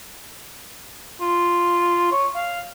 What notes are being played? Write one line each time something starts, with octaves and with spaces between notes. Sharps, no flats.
F4
C#5
F5